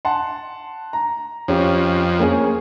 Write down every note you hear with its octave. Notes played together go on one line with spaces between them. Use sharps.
F#5 A5 C6
A#5
F2 C#4 G4
A#3 C#4 G#4